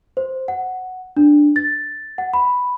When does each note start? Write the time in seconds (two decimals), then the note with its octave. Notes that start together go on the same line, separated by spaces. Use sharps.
0.17 C5
0.48 F#5
1.17 D4
1.56 A6
2.18 F#5
2.34 B5